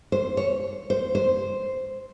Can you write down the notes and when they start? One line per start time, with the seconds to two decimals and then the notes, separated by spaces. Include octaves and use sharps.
0.12 C5
0.37 C#5
0.90 C5
1.15 C5